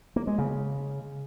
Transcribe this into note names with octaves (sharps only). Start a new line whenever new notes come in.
A#3
G#3
C#3